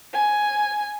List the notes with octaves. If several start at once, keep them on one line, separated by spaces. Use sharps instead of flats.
G#5